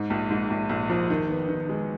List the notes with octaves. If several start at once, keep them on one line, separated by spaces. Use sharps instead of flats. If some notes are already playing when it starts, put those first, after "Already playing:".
Already playing: G#2
A#1
G#2
A#1
A#1
F3
D#3
B3
D#3
G#3